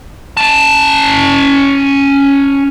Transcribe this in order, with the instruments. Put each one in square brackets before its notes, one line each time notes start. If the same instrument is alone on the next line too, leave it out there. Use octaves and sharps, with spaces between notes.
[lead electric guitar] C#4 A5